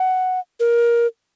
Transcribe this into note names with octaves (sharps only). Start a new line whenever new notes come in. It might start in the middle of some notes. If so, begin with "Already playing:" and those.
Already playing: F#5
A#4